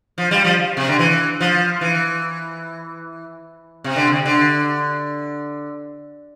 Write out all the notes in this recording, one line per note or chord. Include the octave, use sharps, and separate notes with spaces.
F3
G3
F3
C3
D3
E3
F3
E3
C3
D3
C3
D3